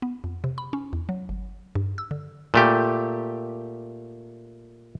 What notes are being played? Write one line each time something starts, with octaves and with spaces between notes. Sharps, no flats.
B3
F2
C3
B5
C#4
E2
F#3
G1
G2
E6
D3
A#2 A3 G4